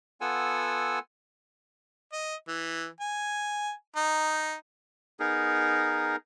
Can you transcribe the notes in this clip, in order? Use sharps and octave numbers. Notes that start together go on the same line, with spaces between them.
B3 F4 A4 F#5 G#5 E6
D#5
E3
G#5
D#4
B3 D#4 G#4 A#4